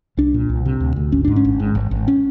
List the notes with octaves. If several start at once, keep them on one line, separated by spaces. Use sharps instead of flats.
C2 D4
A#2
C2
C3
D2
D2
G#1 C#4
G#2 D4
C#4
G#1
G#2
G#1
G#1
C#4